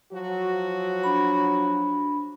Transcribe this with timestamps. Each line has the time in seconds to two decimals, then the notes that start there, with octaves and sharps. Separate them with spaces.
0.12 F3 F#3 F#4
1.04 D4 B5